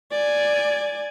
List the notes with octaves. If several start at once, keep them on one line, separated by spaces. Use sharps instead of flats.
D5 G#5